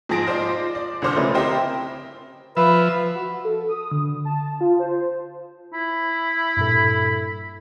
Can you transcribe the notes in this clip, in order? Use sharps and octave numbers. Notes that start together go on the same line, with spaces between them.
G#2 F3 G#4 A5 A#6 D7
F4 C5 D5 D#5
D5
C2 D3 C5 D6 F6
C#3 F3 A3 C#4 A#4 B4
C4 E4 G4 A#4 C5 D#5
F3 B4 E5
F#4
A4
D#6
D3
A5
F4
C5
E4
G2 A#2 A4